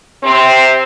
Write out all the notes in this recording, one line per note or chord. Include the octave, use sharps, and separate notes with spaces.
C3 C4